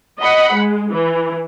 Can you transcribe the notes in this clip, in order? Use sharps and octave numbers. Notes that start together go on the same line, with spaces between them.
D#5 F#5 B5 C#7
G#3
E3